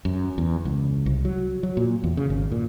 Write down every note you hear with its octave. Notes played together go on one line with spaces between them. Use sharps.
F#2
E2
C#2
C2
F#3
F#3
A#2
E2
C#3
G#1
A#2